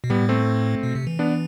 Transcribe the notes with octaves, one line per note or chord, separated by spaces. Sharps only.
B2
A2 G3 B3
A3 C4
B2
C3
E3
B3 D4